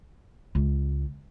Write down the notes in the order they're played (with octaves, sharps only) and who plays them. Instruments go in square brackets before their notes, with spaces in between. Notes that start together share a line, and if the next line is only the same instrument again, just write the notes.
[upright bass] C#2